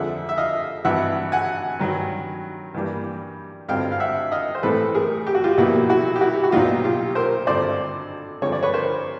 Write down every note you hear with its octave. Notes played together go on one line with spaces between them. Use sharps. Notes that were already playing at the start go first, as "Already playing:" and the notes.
Already playing: F2 D3 F3 G#3 E5 F#5
E5
D#5 F5
G#1 G2 E3 E5 F#5
F#5 G#5
G2 D#3 F#3
G2 E3 G3 A#3
G#1 G2 D3 G3 C4 F5 G5
F5
E5 F#5
D#5 F5
C5
A2 E3 G#3 C4 A4 B4
G#4 A#4
G4
F#4
F4 G4
B1 A#2 F3 A#3 E4 F#4
E4 F#4
G4
E4 F#4
F#4
B1 A#2 F#3 D#4 F4
F4 G4
A#4 C5
G#1 G2 D3 C5 D5
G2 D3 F3 G#3 C4 C#5
D5
B4 C#5
A#4 C5